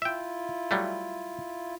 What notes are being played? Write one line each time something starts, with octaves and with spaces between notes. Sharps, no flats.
E4 F4 E5 G5
F#3 G3 A3